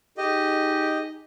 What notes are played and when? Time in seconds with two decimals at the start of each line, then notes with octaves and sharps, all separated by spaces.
0.18 D#4 G4 G#4 D#5